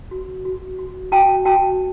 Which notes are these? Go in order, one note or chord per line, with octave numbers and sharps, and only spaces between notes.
F#4
F#4
F#4
F#4 G5 A5
F#4 G5 A5